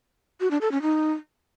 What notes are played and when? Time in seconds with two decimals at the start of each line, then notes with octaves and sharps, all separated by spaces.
0.40 F#4
0.51 D4
0.61 A4
0.72 C#4
0.82 D#4